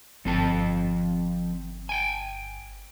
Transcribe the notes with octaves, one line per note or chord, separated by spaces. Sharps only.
G1 F3 C4 A5
G5 G#5